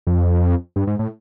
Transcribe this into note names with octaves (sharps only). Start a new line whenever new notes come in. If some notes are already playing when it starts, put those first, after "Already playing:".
F2
G2
G#2
A2